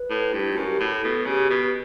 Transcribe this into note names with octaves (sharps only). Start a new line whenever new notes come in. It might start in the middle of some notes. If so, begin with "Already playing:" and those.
Already playing: B4
A2
G2
E4
F#2 F#4
G4
A2 A4
B2
C#3 G4
B2